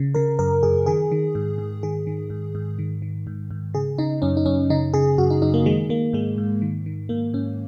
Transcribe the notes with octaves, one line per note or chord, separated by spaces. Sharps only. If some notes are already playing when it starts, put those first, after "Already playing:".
Already playing: C#3
C#3 A#4
F#2 A#4
F#2 G#4
D#3 G#4
D#3
G#2
G#2
D#3 G#4
D#3
G#2
G#2
D#3
D#3
G#2
G#2
C#3 G#4
C#3 D#4
F#2 C#4
D#4
F#2 C#4
C#3 D#4
C#3 G#4
F#2 F#4
D#4
F#2 D#4
A#3
D#3 G#3
D#3 A#3
G#2 G#3
G#2
D#3
D#3
G#2 A#3
G#2 C#4